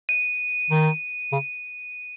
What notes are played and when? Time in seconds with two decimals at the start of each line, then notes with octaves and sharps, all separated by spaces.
0.09 D#7
0.70 D#3
1.32 C#3